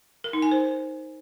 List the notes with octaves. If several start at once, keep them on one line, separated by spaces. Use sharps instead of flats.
A#4
D#4
G#5
C5